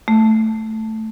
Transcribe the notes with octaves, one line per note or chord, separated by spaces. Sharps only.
A3